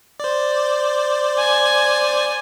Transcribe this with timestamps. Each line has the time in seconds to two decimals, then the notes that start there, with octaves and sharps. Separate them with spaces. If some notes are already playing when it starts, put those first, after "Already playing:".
0.20 C5 D5
1.38 G#5